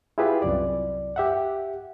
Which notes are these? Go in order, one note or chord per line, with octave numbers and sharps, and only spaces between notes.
E4 F4 G4 G#4 B4
C2 F#2 D5
G4 E5 F#5